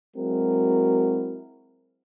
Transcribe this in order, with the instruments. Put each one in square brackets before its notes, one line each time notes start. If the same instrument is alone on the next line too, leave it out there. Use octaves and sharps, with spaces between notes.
[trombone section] F#3 G#3 C4 E4 F#4 A#4